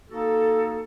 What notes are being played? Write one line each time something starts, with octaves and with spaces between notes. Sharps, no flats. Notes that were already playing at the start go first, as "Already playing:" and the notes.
A#3 D#4 F#4 A4